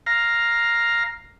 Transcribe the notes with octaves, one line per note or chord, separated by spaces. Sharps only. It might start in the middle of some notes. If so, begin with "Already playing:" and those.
F5 A#5